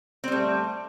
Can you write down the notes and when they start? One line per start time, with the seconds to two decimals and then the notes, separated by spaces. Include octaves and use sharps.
0.24 C4
0.28 G3
0.32 A3